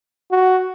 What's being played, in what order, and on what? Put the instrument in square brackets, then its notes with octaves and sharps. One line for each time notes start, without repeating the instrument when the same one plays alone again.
[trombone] F#4